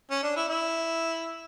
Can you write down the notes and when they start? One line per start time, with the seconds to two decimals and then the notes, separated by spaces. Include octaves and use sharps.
0.11 C#4
0.23 D4
0.36 E4
0.48 E4